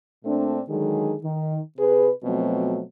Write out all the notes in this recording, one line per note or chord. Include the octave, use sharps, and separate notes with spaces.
A#2 A3 C4 D4
D3 D#3 F#3 G#3 G#4
D#3
C3 G#4 B4
B2 F3 F#3 A3 C4